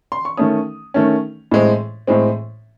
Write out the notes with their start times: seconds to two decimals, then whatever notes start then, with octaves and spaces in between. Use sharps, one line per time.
0.12 C6
0.25 C#6
0.37 D#3 A3 C#4 D#6
0.94 D#3 A3 C#4
1.51 A2 G#3 C4
2.07 A2 G#3 C4